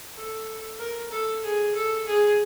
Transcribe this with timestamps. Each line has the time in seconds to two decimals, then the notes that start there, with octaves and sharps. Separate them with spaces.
0.15 A4
0.79 A#4
1.10 A4
1.43 G#4
1.74 A4
2.06 G#4